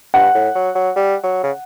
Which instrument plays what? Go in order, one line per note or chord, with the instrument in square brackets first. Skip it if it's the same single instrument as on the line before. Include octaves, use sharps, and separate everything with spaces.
[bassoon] G2 [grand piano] F#5
[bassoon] A2
F#3
F#3
G3
F#3
C#3